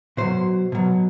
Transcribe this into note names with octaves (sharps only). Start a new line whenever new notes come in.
B2 F#3 C5
B2 F#3